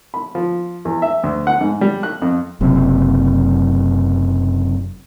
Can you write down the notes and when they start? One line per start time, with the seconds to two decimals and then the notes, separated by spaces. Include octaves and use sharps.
0.14 B5
0.35 F3
0.85 E2
1.02 E5
1.23 D2
1.47 F#5
1.61 G#2
1.81 G3
2.03 F#6
2.22 F2
2.61 F#1 F#2 C3